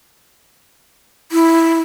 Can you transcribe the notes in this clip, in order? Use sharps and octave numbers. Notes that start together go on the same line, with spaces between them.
E4